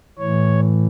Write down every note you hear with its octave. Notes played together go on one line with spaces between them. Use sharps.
A2 E3 C#5